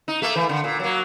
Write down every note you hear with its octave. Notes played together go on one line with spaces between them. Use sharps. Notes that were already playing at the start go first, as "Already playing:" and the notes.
D#4
A3 A#3
E3
D3
A#2
F#3 A#3